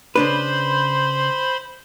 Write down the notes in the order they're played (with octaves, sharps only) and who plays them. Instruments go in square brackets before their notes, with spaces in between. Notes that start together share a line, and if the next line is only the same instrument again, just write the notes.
[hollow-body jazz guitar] C#3 D4 B4 [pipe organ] C5 B5 C6